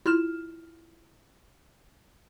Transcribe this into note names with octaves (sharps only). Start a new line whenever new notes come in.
E4 F4 F6 E7